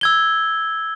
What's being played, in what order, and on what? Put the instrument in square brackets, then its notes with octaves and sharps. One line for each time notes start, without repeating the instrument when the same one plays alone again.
[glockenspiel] E6 G#6 G7